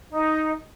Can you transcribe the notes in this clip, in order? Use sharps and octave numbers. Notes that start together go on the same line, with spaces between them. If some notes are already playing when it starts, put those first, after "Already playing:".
D#4